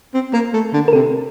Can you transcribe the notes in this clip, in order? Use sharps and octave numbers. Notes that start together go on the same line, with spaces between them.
C4
A#3 A#4
A3
D3
A#4
C3 A4